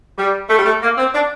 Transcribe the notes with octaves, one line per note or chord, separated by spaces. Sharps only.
G3
A3
G3
A3
A#3
C4
D4